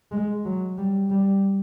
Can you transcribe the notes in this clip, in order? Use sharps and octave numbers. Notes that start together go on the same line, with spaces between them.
G#3
F#3
G3
G3